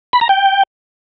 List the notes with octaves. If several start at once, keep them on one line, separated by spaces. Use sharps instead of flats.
B5
A#5
G5